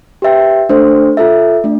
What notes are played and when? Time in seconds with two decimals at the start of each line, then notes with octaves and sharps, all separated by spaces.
0.22 G4 B4 E5 G5
0.69 A3 D4 A4 C5
1.17 F4 A4 E5
1.64 A3 D4